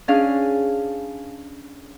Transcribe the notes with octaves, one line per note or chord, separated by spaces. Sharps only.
C#4 D4 G#4 F5